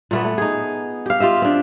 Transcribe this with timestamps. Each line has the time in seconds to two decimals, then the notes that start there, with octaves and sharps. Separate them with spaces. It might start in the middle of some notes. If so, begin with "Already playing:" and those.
0.11 A#2 A3 B3
0.25 A3
0.38 D#4 G#4
1.06 G4 F5
1.20 F4 G4 D#5 E5
1.42 C4 D4